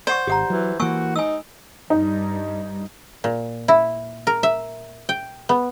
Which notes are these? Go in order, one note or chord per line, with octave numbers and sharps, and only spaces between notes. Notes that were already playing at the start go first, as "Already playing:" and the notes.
C5 D5 F#5 C#6
G#1 G4 F#5 A#5
E3 F#3
E3 A#3 F#4 G#5 C#6 E6
D#4 G#5 E6
G2 D#4
A#2
E4
A#4
E5
G5
B3